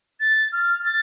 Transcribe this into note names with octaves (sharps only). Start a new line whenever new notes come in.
A6
F6
A6